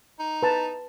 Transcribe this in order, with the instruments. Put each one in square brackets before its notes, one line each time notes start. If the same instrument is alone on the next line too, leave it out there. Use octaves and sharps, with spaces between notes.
[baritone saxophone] D#4
[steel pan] B4 A5